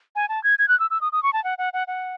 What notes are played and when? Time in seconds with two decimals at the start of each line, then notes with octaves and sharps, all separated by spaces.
0.16 G#5
0.29 A5
0.44 G#6
0.59 G#6
0.68 F#6
0.80 E6
0.91 E6
1.01 D#6
1.12 D#6
1.23 C#6
1.33 A5
1.44 F#5
1.58 F#5
1.73 F#5
1.88 F#5